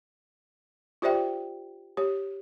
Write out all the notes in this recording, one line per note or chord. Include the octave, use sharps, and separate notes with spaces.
F4 G4 C5 D5 E5 G5
G4 C#5